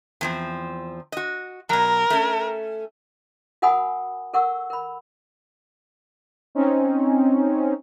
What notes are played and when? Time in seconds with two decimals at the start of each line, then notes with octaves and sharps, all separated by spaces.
0.21 E2 F3 C4
1.12 F#4 D#5
1.69 B2 F#3 A#4
2.10 A3 C#4
3.62 F#4 A#4 F#5 G#5 B5 D#6
4.33 A4 A#4 F#5 C#6 E6
4.70 A#4 B5
6.55 C4 C#4 D#4